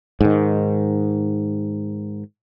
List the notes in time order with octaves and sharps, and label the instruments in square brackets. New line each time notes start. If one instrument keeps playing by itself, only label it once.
[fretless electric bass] G#2 D#3